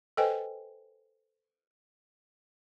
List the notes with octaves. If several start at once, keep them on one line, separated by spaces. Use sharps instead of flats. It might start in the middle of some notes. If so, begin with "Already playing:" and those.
A4 B4 C5 D#5 G5 G#5